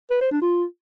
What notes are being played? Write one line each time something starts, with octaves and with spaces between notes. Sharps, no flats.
B4
C5
D4
F4